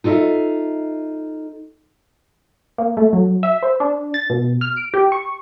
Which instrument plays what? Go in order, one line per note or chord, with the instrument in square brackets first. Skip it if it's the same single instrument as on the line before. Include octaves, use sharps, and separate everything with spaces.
[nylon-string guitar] D#4 F4 A4 D#5 E5
[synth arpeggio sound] A#3
A3
F#3
E5
C5
D4
A6
B2
F6
D7
G4
C#6